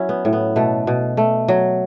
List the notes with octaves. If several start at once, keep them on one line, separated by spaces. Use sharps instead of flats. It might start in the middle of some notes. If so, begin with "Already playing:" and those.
Already playing: F#3 C#4 E4
B3
A2
B3
B2 A3
B2
A3
F#3